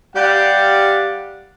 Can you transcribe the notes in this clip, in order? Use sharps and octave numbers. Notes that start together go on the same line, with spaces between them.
G3 G4 D5 F5 F#5